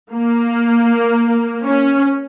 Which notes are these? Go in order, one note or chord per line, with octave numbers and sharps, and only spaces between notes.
A#3
C#4